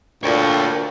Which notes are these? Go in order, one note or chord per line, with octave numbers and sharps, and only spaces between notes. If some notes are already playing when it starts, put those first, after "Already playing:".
D2 A#2 C#5 G5